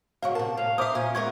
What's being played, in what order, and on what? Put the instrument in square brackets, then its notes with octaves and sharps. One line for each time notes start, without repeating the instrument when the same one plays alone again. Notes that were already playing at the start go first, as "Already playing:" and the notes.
[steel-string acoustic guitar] G#2 C#3 F#3 [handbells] F5 C#6
[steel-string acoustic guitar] C3 A5 [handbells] A#4
[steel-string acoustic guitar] A2 [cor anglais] F5
[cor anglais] A#4 [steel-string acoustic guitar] C5 F5 [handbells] E5 D6 D#6
[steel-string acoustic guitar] A#2 G#5 [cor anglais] C#4
[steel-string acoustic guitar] G#3 B3 A#4 [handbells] E5 C#6 G#6